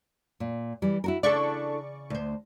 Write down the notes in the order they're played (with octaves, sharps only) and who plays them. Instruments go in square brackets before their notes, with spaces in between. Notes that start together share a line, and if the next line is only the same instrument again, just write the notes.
[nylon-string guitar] A#2
E3 G3
E4 F#4 A#4
[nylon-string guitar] C#3 [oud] D4 E4 A4 [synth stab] D5 C#6
[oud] D2 C5